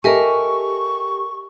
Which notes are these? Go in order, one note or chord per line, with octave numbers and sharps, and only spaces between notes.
G4 A4 A#4 D#5 E5 G#5 C#6